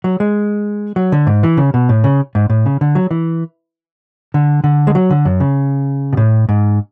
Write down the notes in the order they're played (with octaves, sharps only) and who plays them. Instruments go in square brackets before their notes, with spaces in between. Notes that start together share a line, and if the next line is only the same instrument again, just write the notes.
[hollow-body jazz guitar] F#3
G#3
F#3
D3
G#2
E3
C#3
B2
A2
C#3
G#2
A2
C#3
D3
F#3
E3
D3
D3
G#3
F#3
D3
F#2
C#3
B2
A2
G#2